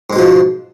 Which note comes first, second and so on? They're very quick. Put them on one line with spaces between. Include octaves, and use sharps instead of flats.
G#2 G#3 B2 F3